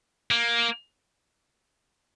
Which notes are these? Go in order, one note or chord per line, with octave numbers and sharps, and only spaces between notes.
A#3